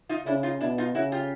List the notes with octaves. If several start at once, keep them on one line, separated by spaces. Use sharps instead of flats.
D#4 F4
C#3 D4 E4
D#4 F4
B2 D4 E4
D#4 F4
C#3 E4 F#4
F4 G4